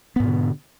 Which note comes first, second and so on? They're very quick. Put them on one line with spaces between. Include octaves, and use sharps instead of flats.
B3 G#2 B2 D3